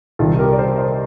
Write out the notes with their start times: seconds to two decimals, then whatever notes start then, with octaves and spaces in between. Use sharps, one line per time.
0.19 C2 C3 D#3 G3 F4 A4
0.39 G4 A#4
0.53 D5
0.58 A4 C5
0.78 C5 D#5